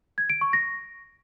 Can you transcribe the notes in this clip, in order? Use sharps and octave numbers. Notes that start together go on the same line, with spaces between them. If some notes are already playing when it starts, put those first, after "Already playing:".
G#6
D7
C#6
A#6